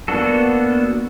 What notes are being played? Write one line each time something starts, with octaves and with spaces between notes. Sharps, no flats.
A#3 B3 D4 F#4 A4